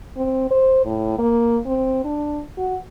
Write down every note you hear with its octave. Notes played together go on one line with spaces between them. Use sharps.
C4
C5
A2
A#3
C4
D4
F#4